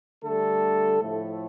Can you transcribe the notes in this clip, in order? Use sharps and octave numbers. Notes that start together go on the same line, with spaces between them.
D3 G3 A3 A4
A2 F3 A3